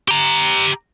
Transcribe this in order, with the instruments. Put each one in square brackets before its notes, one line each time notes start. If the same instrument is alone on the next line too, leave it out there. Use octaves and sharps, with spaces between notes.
[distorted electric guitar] G4 A#5